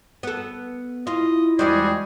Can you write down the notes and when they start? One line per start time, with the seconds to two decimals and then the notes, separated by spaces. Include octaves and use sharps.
0.23 B3 A4
1.07 E4 F4 D#5
1.59 E2 G3 G#3 D4 F#4 G#4 C5